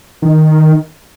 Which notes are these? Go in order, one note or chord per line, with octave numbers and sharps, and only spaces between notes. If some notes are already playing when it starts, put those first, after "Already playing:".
D#3